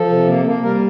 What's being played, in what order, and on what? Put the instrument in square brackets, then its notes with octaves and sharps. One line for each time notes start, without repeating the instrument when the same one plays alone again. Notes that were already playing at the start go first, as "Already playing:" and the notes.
Already playing: [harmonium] F3 A4
C3
A#3
A#3
G3 A#4